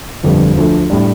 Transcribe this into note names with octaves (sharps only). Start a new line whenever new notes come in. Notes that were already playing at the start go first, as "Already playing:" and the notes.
G1 F2 D3 G3
D2 D3 F3 A3
A2 G3 D4